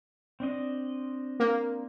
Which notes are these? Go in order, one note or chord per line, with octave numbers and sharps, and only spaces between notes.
C4 D4 D#5
A#3